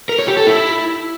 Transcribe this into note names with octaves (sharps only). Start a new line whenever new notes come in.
A#4
C#5
G4
A4
E4